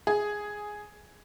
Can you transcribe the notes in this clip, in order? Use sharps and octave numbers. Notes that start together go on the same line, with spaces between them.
G#4